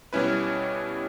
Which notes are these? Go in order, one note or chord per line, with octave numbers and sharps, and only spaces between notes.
B2 G3 C#4 E4 B4